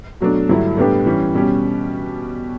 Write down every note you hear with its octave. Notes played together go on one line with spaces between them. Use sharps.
B2 F#3 A3 D4
G2 D3 F#3 A3 E4
A2 G3 B3 D4 G4
E3 G3 C#4
B2 G3 C#4 G4